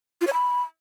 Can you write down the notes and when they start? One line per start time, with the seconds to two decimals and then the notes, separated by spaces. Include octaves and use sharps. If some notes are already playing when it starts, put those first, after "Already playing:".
0.21 F4
0.27 C#5
0.33 B5